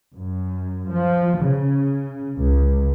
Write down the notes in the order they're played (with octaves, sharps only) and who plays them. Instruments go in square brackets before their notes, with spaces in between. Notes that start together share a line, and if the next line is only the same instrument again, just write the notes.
[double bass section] F#2
F3
C#3
C#2